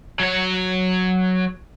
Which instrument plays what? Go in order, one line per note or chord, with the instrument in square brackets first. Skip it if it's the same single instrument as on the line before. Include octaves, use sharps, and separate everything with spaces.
[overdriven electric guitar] F#3 C#5